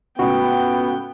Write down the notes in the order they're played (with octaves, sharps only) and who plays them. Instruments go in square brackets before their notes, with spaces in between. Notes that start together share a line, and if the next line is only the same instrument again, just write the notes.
[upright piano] C#2 A2 [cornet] B3 [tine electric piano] F#4 [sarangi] G5